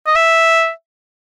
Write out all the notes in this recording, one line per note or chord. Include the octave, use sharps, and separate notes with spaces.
D#5
E5